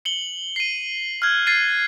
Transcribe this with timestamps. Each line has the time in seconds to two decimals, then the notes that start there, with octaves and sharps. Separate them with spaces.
0.05 C#7 F#7 G7
0.56 C7 D#7
1.22 F6 F#6 G#6
1.47 A6 C7 D#7